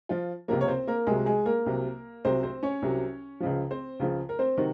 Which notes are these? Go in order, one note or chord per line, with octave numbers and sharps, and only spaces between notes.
F3 F4
C#2 C3 F3 A#3 A#4
C#5
C4 C5
A#3 A#4
C2 C3 F#3 G#3 G#4
G#3 G#4
A#3 A#4
C2 C3 F#3
C2 C3 F#3 C4 C5
C4 C5
C#4 C#5
C2 C3 F#3
C#2 C#3 F3
C4 C5
C#2 C#3 F3
A#4
C4 C5
C3 D#3 F#3 F#4